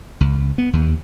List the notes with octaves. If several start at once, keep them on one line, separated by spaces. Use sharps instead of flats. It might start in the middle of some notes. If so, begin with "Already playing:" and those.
C#2
B3
D#2